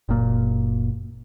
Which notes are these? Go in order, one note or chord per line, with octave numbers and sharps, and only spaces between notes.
F#1 A#2